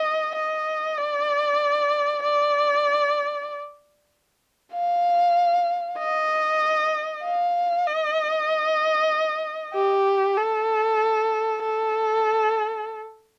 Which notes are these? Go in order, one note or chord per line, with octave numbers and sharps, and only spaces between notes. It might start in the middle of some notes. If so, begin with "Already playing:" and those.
Already playing: D#5
D#5
D5
D5
F5
D#5
F5
D#5
G4
A4
A4